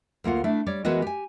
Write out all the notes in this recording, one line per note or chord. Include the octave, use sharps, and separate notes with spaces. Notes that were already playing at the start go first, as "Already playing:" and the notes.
D2 A#3 F4 F#5
A3 D4 E4
G3 C#5 D5
E3 G#3 B3 F#4 A#4 D#5
G4 G#5